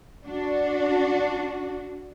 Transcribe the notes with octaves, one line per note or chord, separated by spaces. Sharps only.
D4 F#4